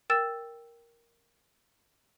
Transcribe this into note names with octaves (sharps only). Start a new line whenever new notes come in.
A#4 G5 E6 A6 E7